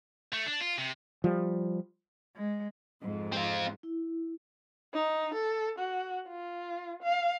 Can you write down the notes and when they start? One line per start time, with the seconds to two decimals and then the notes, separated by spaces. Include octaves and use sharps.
0.33 A3
0.46 D4
0.61 F4
0.78 C3
1.24 F3 G3
2.36 G#3
3.01 F2 G#2
3.33 C4 F4
3.83 E4
4.93 D#4
5.34 A4
5.78 F#4
6.28 F4
7.03 F5